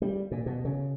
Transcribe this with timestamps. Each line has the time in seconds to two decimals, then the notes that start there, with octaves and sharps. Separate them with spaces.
0.02 G3
0.31 A#2
0.46 B2
0.65 C#3